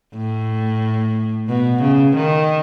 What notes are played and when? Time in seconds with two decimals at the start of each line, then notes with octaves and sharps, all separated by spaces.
0.16 A2
1.49 B2
1.82 C#3
2.16 D#3